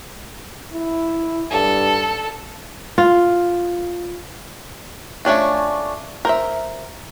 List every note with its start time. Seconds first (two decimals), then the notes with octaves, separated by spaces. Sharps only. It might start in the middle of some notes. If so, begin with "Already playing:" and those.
0.72 E4
1.51 G2 A4
2.98 F4
5.25 A3 C#4 D4 F4
6.25 A#4 C5 E5